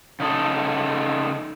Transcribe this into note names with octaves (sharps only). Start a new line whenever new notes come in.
C#3 D#4 A4